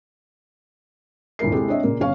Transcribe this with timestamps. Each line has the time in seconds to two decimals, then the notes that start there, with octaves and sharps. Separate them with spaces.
1.39 D#1 G2 A#3 E4 A#4 C7
1.52 C3 G#3 E4 G4 A4
1.68 C4 D4 C#5 D#5 E5
1.83 A#2 C#3 A#3
2.00 G1 C#4 C#5 F5 C#6